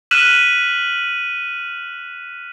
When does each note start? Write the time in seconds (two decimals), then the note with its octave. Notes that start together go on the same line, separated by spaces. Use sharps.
0.11 F6 F#6 B6 D#7 E7 F#7